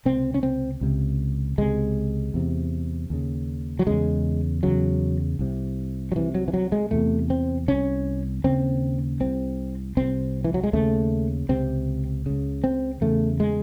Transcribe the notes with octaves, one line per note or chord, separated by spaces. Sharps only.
C#2 C3 C4
C#4
C4
C#2 C3
C#2 C3 G#3
E2 C3
D#2 C#3
F#3
E2 C#3 G#3
E2 C#3 F#3
C2 C3
F#3
C2 C3 E3
F#3
E3
F#3
G#3
E2 C3 A3
C4
C2 C3 C#4
D#2 C#3 C4
C2 C3 C4
C2 C3 C4
E3
F#3
G#3
D#2 C#3 A3
C#2 C3 C4
C#2 C#3
C4
E2 C#3 A3
G#3